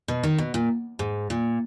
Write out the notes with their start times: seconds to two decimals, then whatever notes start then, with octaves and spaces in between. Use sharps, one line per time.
0.08 B2
0.23 D#3
0.38 B2
0.54 A#2
0.99 G#2
1.30 A#2